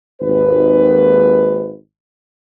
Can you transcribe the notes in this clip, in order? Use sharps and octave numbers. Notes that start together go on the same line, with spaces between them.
G#1 D#2 B4